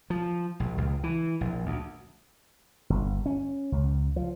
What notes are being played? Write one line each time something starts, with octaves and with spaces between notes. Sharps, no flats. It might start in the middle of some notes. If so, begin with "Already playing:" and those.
F3
A#1
C#2
E3
A#1
D2
G1
C#4
C#2
F3